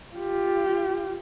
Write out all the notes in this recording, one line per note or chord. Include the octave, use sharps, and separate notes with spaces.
F4 G4